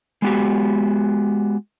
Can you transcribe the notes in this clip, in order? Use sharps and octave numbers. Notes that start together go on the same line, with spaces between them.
G#3 B3 F#4 G4